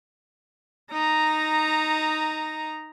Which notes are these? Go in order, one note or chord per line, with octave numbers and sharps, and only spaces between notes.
D#4 A#5